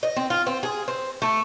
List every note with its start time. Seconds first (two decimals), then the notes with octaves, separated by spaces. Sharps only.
0.03 D#5
0.16 C4
0.30 F4
0.47 C4
0.63 G#4
0.88 C4
1.22 A3